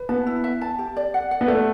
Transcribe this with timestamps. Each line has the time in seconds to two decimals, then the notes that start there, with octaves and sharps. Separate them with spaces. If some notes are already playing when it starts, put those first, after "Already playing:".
Already playing: B4
0.09 B3 A5
0.27 E4
0.44 E5
0.61 A5
0.79 G4
0.96 D5
1.14 F#5
1.31 F#5
1.41 B3
1.48 A3 D5